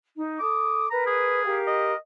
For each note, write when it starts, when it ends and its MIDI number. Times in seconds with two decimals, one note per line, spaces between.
0.14 0.39 63
0.39 0.85 69
0.39 0.90 86
0.39 0.85 87
0.90 1.44 70
0.90 1.44 71
0.90 1.04 82
1.06 1.58 68
1.45 1.91 67
1.45 1.91 70
1.45 1.91 77
1.67 1.96 75